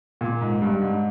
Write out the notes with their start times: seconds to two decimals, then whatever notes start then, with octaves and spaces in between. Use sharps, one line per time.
0.21 A#2
0.41 G#2
0.62 G2
0.81 G#2